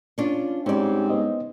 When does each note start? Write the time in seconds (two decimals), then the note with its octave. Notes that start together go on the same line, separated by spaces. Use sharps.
0.18 C#4 D4 F4
0.66 G#2 G3 C4 C#4 D5
1.10 B3 C5 D#5